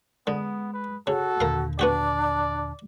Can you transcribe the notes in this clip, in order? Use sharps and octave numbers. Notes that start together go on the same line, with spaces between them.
D3 G#3 B3
B4
C#3 F#4 A4
D#2 A#2 D3 A#4 F5
B3 D4 F#4 G4 D5